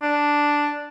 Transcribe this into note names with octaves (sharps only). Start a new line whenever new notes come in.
D4